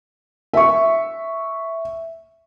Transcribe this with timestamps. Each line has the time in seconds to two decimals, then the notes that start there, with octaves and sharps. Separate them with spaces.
0.53 E5 C#6